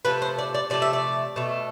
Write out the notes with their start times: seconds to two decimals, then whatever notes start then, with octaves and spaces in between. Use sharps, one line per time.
0.05 C3 F3 A3 B4
0.22 C5
0.38 D5
0.54 D5
0.70 C3 F3 A3 D5
0.82 E5
0.93 D5
1.36 B2 A3